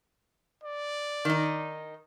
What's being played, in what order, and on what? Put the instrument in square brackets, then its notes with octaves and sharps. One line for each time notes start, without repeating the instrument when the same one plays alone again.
[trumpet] D5
[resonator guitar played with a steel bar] D#3 D#4